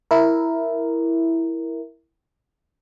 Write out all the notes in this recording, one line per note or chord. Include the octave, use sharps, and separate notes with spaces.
E4 A#4